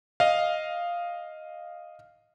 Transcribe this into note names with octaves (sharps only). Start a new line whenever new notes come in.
D#5 F5